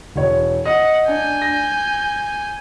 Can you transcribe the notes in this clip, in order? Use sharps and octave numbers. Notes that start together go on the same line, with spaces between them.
E1 C#5
D#5 F#5
D4 G#5 G6
A#6